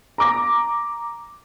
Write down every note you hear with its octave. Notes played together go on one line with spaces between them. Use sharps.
A#5 D6 A#6